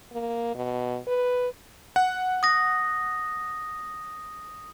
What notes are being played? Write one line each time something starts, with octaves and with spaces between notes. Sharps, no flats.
A#3
B2
B4
F#5
D#6 A#6